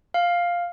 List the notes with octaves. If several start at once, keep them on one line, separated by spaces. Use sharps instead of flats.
F5